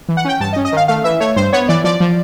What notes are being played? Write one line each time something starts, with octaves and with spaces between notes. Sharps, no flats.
E3
F#5
C#4 G5
G2 A5
D#5
C#4
D#5
D#3 F5
A3 F5
E3 E5
A3 C#5
G2 C5
B3 C#5
E3 D5
F3 D5
F3